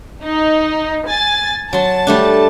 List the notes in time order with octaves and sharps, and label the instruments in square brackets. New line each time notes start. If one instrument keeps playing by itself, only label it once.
[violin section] D#4
G#5 A6
[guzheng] F#3 C6 [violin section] A5
[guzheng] G3 A3 D4